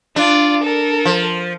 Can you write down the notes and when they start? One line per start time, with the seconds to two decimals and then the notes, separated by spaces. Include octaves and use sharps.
0.16 D4 F4 D5
0.63 A4 A#4
1.06 F3